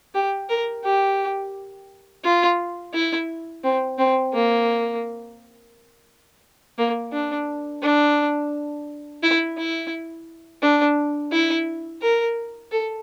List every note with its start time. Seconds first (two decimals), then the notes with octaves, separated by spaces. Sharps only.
0.15 G4
0.49 A#4
0.84 G4
2.24 F4
2.93 E4
3.64 C4
3.98 C4
4.33 A#3
6.78 A#3
7.13 D4
7.83 D4
9.23 E4
9.58 E4
10.62 D4
11.32 E4
12.02 A#4
12.71 A4